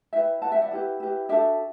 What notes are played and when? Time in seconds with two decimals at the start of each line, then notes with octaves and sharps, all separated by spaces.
0.13 E4 B4 E5 G5
0.42 E4 B4 F#5 A5
0.52 E5 G5
0.62 D5 F#5
0.72 E4 G4 B4
1.00 E4 G4 B4
1.29 D4 F#4 A4 E5 G5